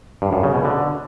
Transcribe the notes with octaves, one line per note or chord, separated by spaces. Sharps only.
G2
F#2
C#3
B2
D3